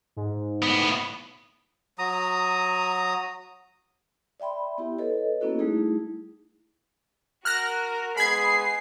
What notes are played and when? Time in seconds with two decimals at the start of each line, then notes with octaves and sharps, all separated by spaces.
0.17 G#2
0.62 A2 B3
1.99 F#3 A#5 D#6
4.40 D5 E5 G5 B5 C6
4.78 B3 E4 G4
4.98 A4 B4 C#5 D#5
5.41 A#3 B3 C#4 E4 F#4 A4
5.59 G3 A3 D#4 E4 G#4
7.45 F#4 A#4 F6 F#6 A#6
8.17 G#3 B3 G#4 B5 G#6 C7